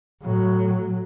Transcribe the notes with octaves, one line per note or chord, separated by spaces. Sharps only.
A2 F#3